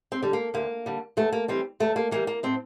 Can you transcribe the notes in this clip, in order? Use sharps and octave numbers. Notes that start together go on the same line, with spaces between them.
C4
D3 G3
A#3
D2 A#3
D3 G3
E2 A3
A#3
E3 G3 C4
E2 A3
A#3
E3 G3 A#3
A#3
A2 C4